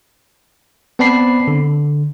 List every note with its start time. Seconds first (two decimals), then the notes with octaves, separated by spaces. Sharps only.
0.99 B3 C4 D5 A5 B5 C7
1.47 D3